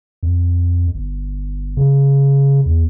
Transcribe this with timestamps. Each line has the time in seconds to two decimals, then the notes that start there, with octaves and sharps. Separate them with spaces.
0.23 F2
0.95 G1
1.77 C#3
2.66 E2